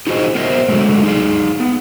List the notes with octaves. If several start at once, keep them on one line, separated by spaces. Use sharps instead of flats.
D#4 F4 F#4 G#4 C5 D#5
B3 A#4 C5 C#5 D#5 E5
D3 F#3 G#3 A3
D#4 G#4 F5
B3